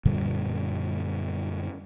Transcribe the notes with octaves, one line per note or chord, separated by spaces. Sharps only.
F#2 A#2 D3 G3